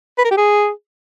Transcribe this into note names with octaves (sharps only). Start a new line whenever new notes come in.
B4
A#4
G4
G#4